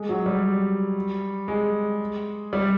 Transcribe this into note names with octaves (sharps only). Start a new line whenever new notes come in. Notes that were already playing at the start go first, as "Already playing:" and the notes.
Already playing: G#3
F#3
G3
G#3
G3